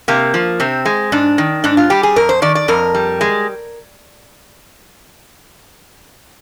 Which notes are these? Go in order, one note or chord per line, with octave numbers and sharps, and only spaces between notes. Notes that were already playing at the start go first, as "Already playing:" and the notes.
C3 A#3
F3
C3 C4
G#3
G#2 D4
D#3
G#2 D4
F4
G3 G4
G#4
F2 A#4
C5
D#3 D5
D5
F2 A#4
G3
G#3